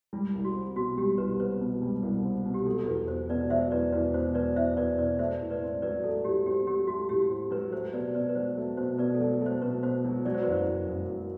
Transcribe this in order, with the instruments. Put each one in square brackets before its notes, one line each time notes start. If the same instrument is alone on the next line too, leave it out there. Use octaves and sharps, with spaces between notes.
[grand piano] G3 [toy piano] E4
[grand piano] C2
[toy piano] F#4
[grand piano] C4
[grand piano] B2 [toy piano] F#4
[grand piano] G3 [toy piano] G4
[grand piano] C2 [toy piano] B4
[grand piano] C4 [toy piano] B4
[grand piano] B2
G3
C2
C4
B2
[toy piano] G4
[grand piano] F#3 [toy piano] A4
[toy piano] A4
[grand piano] E2 [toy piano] B4
[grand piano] E2 [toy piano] C5
[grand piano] B2 [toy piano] B4 D5
[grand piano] F#3 [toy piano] C5 E5
[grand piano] E2 [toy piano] B4 D5
[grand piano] E2 [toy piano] B4
[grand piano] B2 [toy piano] C5
[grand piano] F#3 [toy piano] B4 D5
[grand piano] E2 [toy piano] C5 E5
[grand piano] E2 [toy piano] B4 D5
[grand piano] B2 [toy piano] B4 D5
[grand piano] A3 [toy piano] C5 E5
[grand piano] A2
[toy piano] B4 D5
[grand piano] C4
[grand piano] F#3 [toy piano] B4 D5
[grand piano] A3 [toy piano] A4
[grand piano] A2 [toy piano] G4
[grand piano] C4 [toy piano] G4
[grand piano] F#3 [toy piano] G4
[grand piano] A3 [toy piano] F#4
[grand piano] A2 [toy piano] G4
[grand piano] C4
[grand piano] F#3 [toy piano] B4
[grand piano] A3 [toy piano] C5
[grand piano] B2 [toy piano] B4 D5
[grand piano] B2 [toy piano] B4 D5
[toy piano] B4
[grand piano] F#3 [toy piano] C5
[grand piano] A3
[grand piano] B2 [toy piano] C5
[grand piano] B2 [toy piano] B4 D5
[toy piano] A4
[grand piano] F#3
A3
[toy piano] C5
[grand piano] B2 [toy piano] B4
[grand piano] B2 [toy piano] C5
[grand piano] F#3
[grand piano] F#3 [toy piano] D5
[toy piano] C5
B4
[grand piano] F#1 [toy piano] C5
[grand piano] F#1
F#2
F#3